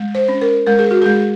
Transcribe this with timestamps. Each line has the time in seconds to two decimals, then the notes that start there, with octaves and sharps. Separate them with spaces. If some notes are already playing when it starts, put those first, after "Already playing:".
Already playing: G#3
0.15 C5
0.28 C#4
0.41 A#4
0.67 G#3 A#4
0.79 G#4
0.91 F#4
1.02 G#3 G#4